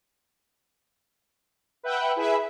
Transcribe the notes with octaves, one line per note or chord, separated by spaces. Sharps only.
B4 E5 F#5 G5
E4 G#4 B4 E5